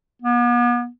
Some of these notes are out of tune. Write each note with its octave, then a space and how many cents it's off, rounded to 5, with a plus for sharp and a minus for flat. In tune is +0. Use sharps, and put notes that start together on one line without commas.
B3 -40